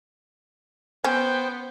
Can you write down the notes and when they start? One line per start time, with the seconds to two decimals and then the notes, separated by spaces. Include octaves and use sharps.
1.04 B3 C#4 C5 G5